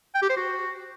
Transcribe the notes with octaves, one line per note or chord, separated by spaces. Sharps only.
G5
G4
C5
F#4